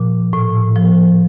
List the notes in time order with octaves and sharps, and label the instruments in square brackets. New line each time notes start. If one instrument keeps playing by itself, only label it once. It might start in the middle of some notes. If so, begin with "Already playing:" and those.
Already playing: [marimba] A#2 F3
A2
F3